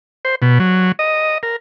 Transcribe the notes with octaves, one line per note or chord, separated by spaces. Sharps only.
C5
B2
F#3
D#5
A#4